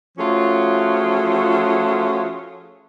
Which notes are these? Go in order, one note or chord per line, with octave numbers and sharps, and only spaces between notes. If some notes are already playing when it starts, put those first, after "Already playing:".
F3 A3 C#4 F4 F#4 G#4